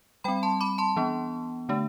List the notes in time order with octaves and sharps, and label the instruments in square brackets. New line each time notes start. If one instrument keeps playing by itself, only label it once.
[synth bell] G3 G5 B5
C4
A5 C6
B5 D6
A5 C6
E3 B3 D4
D3 A3 D4